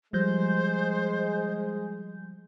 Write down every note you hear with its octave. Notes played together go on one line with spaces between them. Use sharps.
F3 G3 G#3 C5 G6